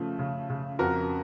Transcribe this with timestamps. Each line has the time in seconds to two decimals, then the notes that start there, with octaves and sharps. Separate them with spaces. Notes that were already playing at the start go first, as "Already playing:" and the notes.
Already playing: C#3 F3 A3
0.19 C#3
0.50 C#3
0.79 F2 F#4 A#4